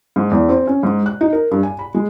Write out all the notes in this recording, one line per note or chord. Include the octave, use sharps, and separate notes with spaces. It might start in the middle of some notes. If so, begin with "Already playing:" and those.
G#2
E2
C4
C#4
G#2
F#6
D#4
A#4
G2
G#5
B5
G#3